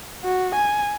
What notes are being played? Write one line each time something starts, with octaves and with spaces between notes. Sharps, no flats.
F#4
G#5